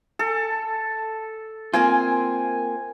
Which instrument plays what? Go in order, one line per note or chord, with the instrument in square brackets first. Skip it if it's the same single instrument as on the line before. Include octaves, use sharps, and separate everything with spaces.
[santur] A4
[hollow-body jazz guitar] A#3 C4 F4 [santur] G#5